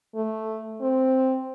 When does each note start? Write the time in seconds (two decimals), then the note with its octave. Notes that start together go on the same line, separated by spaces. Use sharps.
0.15 A3
0.81 C4